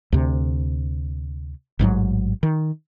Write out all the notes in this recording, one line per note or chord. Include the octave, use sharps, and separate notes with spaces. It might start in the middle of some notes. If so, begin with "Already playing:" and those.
D2 C3
A1 G#2 B2 F#3
D#3